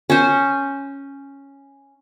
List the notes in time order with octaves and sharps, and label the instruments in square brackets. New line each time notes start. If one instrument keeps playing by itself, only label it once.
[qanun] C#4 C5